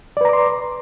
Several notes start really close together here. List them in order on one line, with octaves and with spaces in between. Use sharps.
D5 B4 A#5 D6 C6